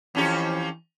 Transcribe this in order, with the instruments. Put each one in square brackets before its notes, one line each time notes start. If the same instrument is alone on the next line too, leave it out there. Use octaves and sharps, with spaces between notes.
[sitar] F2 C#4 G4 [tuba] E3